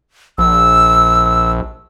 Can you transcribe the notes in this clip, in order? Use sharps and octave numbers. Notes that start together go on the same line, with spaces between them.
A#1 E6